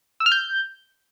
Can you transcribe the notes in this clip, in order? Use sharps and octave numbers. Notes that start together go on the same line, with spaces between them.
E6
F6
G6